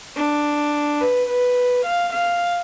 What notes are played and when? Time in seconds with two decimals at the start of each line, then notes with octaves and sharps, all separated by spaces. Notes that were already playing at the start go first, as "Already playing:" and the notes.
0.17 D4
1.01 B4
1.29 B4
1.86 F5
2.13 F5